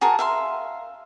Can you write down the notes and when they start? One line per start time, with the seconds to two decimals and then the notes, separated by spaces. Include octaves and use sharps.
0.01 F#4 G#4 A#4 A5
0.19 E5 F5 C6